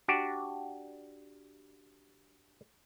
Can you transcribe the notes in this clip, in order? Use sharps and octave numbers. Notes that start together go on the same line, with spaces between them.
D4 F#4 G4 D5